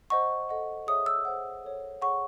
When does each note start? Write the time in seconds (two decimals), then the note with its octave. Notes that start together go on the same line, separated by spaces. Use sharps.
0.10 C5 D#5 F#5 C#6
0.49 A4 D#5 F#5
0.87 G#4 C#5 E5 D#6
1.06 E6
1.25 G#4 C5 F#5
1.64 A4 C#5 F#5
2.02 G#4 C#5 F#5 C#6